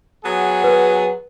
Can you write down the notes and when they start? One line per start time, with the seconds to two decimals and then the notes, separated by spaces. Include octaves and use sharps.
0.24 F#3 B3 G#4
0.64 B4